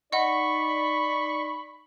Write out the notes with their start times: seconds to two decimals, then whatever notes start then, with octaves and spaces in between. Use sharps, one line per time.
0.13 D#4 D5 D#5 F#5 B5 C#6